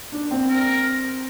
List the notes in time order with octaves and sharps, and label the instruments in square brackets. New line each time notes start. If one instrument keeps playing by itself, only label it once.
[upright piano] D4
C4
[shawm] A#4